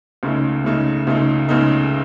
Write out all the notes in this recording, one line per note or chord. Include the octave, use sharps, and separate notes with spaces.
C#2 C#3 A3 D#4
C#2 C#3 A3 D#4
C#2 C#3 A3 D#4
C#2 C#3 A3 D#4